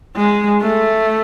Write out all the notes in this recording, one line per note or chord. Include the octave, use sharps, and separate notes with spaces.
G#3
A3